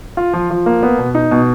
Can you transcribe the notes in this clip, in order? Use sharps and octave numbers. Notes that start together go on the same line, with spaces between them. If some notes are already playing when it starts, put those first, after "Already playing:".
F4
F3
F3
A#3
B3
B2
D#4
B2